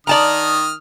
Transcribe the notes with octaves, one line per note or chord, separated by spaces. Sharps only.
D#3 D5 A5 A#5 D#6 F6